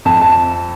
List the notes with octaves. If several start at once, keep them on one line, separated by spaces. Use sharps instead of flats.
F2 A5
A5